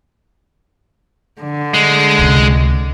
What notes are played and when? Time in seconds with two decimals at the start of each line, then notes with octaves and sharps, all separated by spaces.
1.41 D3
1.74 G#3
2.18 C#2 C3